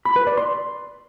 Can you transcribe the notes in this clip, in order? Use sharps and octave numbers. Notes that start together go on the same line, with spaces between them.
B5
B4
D5
C6